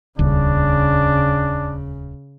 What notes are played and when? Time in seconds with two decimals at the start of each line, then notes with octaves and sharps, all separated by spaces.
0.19 D#1 C#2 C#3 D4